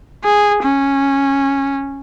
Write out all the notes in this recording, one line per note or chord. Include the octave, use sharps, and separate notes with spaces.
G#4
C#4